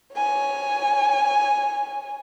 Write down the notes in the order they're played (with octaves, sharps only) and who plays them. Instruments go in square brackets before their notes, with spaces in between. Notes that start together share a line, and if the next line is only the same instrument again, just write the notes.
[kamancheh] C#5 G#5